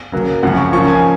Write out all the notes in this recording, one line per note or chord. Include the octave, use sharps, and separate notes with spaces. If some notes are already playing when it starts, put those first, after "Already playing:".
C#3 F#3 A#3
F#2 C#3 F3 C4 F#5
C#6
G#2 F3 A#3 C#4 C#6
G#5